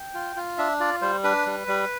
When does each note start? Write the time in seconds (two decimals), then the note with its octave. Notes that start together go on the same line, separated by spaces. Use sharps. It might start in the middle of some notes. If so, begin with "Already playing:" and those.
Already playing: G5
0.14 F4
0.36 F4
0.58 D4 E5
0.80 F4 D5
1.01 G3 C5
1.24 D4 B4
1.46 G3
1.67 G3